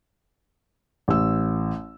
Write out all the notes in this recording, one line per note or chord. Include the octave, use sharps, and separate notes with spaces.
A1 E6